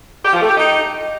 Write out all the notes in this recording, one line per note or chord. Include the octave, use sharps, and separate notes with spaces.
G4
F3
A3
G4
D#4